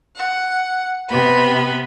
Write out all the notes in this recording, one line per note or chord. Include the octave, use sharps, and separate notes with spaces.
F#5
C3 B3 B4 B5